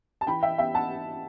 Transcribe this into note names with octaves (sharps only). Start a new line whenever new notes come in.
A5
E3 G5 B5
E5 G5
B3 E5 G5
F#5 A5